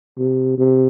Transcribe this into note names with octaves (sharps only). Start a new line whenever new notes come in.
C3
C3